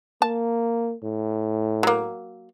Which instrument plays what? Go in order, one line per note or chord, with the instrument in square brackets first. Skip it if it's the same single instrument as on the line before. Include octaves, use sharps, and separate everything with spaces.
[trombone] A#3 [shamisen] A5
[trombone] A2
[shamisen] F#3 A#3